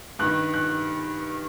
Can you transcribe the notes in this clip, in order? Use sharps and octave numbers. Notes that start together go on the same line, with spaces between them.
G2 D#3 F#6
F#6